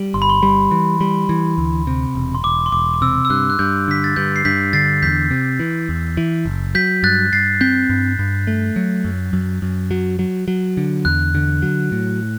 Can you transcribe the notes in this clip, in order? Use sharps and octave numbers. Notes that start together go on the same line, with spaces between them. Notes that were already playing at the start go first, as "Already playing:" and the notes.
Already playing: G3
G1 C6
B5
C6
G3 B5
E3
G3
E3
D2
C3
E1
C6
E1 D6
C6
E1 D6
D6
C3 E6
E6
G2 F#6
F#6
G2 G6
D3 B6
A6
G2 G6
C7
G2 G6 B6
D3 A6 C7
E2 G6 B6
C3
E3
E2
E3
F#1
F#3 G6 B6
G2 F#6 A6
G2 A6 C7
C4 G6 B6
G2
G2
A3
F#3
F#2
F#2
F#2
F#3
F#3
F#3
D3
E2 F#6
D3
F#3
A2